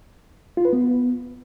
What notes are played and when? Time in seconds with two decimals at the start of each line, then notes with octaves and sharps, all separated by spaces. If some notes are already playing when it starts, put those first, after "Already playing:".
0.57 F4
0.65 B4
0.73 B3